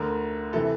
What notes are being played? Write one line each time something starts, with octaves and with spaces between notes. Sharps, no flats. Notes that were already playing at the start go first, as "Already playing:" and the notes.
Already playing: D2 D3 A#4
C3 E3 A4